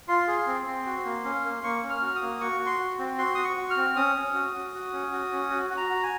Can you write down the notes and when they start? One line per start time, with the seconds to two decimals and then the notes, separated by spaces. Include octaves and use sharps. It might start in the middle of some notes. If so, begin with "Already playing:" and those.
0.08 F4 C6
0.28 G#4
0.47 C4
0.67 C4
0.86 F#4
1.05 A#3
1.25 C#4
1.44 A#3
1.63 A#3 C#6
1.83 C#4
1.90 F6
2.02 F#4
2.15 D#6
2.22 A#3
2.41 F#4 C#6
2.60 F#4
2.66 C6
2.80 F#4
2.99 C4
3.18 F#4 C6
3.35 F#4 D#6
3.44 C#6
3.57 F#4
3.70 F6
3.77 C4
3.96 C#4 D#6
4.16 C#4
4.34 F#4
4.54 F#4
4.74 F#4
4.93 C#4
5.12 F#4
5.32 C#4
5.50 F#4
5.70 F#4
5.77 A#5
5.90 F#4
6.03 G#5